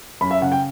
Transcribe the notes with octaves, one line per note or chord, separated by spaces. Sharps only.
F#2 B5
E5
C#3 F#5
G5